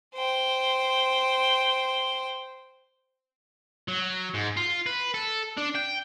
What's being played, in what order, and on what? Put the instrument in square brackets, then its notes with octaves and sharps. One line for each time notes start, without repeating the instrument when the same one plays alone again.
[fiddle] C5 G5
[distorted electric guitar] F#3
G#2
F4
B4
A4
D4
G5